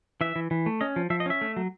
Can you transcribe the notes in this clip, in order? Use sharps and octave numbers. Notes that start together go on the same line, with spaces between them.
E3 E5
E3
E3
A3
C#4 D#5
F3
F3 E5
D#5
C#4 E5
A3
F#3